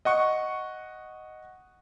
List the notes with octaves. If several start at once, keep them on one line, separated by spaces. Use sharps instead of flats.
D#5 F#5 C#6